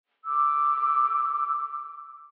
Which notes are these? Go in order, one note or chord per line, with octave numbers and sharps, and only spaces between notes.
D6 E6